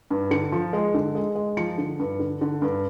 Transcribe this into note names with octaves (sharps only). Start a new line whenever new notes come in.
G2
D3 C#7
F3
G#3
D3
G#3
G#3
F3 C#7
D3
G2
D3
D3
G2